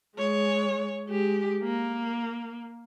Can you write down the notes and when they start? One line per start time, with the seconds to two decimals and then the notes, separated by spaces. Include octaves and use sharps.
0.16 G#3 C#5
1.08 G#3 G4
1.64 A#3